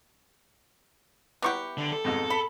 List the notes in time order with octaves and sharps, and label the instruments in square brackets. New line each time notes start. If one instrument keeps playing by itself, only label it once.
[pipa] B3 E4 G4 [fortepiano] F#5 C#6 D6
[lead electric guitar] D3
A4
[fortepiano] F2 G#2 B2
[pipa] B5